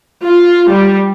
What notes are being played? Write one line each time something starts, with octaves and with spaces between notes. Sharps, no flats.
F4
G3